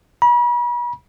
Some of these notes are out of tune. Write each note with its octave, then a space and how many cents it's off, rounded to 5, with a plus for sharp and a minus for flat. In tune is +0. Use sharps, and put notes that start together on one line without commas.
B5 -40